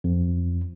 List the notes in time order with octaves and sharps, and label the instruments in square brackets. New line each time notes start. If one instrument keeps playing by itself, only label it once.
[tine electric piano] F2